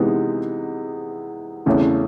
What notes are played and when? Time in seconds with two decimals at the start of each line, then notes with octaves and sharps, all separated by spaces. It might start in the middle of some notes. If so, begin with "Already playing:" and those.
Already playing: C3 E3 G#3 B3 D#4
1.66 E2 C#3 E3 A3